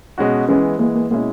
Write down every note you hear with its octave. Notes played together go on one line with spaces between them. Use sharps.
B2 G#3 C#4 F#4
E3 G#3 B3 C#4
E3 G#3 A#3 B3
A#3
B2 G#3 A#3 C#4 E4